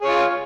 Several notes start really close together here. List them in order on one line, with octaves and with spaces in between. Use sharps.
G#4 C#5 F4